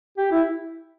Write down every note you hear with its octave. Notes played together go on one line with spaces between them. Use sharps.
G4
E4